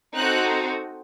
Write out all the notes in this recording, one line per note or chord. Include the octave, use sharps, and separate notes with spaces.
C4 D#4 F#4 A4 F#6